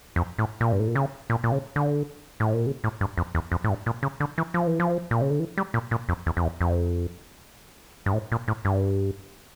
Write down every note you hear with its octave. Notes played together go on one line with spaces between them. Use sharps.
F2
A2
A#2
G2
A2
A#2
C#3
A#2
A#2
C#3
D3
A2
A#2
C#3
A2
G2
F2
E2
F2
A2
G2
A#2
C#3
D3
E3
F3
E3
F3
A#2
C#3
D3
E3
G3
A#2
A#2
F2
E2
F2
E2
F2
G2
A2
A#2
A2
G2